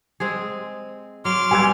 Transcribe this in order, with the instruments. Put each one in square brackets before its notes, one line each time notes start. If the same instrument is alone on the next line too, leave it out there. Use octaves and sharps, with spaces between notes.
[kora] G#3 C4 G#4
[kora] F#3 [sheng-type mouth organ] C6 D6 F6
[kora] G3 B3 G4 [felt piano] G#5 E6 G#6